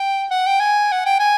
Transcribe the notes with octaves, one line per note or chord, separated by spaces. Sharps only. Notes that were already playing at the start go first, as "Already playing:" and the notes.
Already playing: G5
F#5
G5
G#5
F#5
G5
G#5